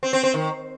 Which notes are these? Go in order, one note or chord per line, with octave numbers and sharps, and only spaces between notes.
C4
C4
C4
D#3